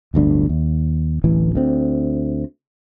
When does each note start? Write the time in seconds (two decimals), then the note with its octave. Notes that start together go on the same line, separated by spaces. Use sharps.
0.14 D1 G1 D2 D4
0.49 D#2
1.24 D1 A1 E3
1.55 D2 C4